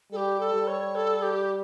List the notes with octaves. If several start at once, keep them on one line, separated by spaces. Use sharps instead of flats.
G3 G4 A4
A4
G3
C#5
A4
G4